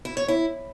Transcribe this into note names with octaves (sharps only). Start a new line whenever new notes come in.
E4
C#5
E4